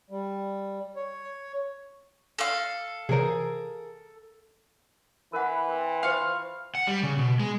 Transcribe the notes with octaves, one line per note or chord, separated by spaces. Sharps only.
G3
C#5
A4 F5
C3 E3 G#4 A#4 C5
E3 A#4 B4 F#5
C4
F4 C5 F5 B5 C#6
F#5
G3
C#3
B2
G#3